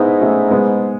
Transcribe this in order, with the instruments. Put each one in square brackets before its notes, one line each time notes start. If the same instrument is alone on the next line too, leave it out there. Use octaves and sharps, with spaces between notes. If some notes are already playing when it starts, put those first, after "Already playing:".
Already playing: [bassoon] G#2 [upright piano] B3 D#4 E4
[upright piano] A3 C#4
G#3 B3